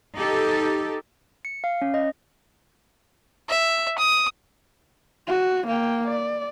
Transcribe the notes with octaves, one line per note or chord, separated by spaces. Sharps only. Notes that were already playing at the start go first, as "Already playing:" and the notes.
D#4 G4 A4
C#7
F5
C#4
D#5
E5
D#6
F#4
A#3 G5
D5